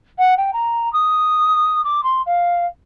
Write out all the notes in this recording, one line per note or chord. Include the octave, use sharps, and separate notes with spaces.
F#5
G5
A#5
D#6
D6
C6
F5